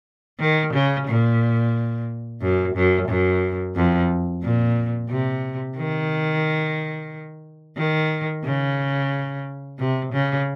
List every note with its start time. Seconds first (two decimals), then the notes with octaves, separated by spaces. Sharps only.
0.40 D#3
0.73 C#3
1.07 A#2
2.41 F#2
2.75 F#2
3.08 F#2
3.75 F2
4.42 A#2
5.09 C3
5.76 D#3
7.77 D#3
8.44 C#3
9.79 C3
10.13 C#3